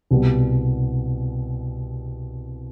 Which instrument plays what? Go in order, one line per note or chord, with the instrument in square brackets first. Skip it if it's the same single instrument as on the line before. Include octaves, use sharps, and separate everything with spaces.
[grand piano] C2 B2 G3 B3